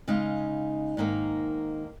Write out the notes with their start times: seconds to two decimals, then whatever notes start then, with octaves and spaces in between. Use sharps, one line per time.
0.08 C#3 G#3 D#4 F5
0.97 G#2 D#3 A#3 D#4